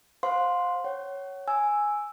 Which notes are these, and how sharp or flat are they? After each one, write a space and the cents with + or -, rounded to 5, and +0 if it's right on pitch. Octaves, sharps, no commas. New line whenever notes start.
C5 +5 F5 +30 C6 +0
C#5 +0 F#5 +35
G#5 +0 E6 +0